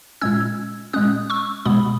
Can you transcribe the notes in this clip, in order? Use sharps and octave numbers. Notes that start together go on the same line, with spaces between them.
A#2 G#3 C#4 E6 G#6
A#2 G#3 C#4 D#6 F#6
C#6 E6
B2 G#3 B3 B5 D#6